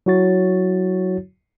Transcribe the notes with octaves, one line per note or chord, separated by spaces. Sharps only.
F#3 E4 F#4 C#5 A6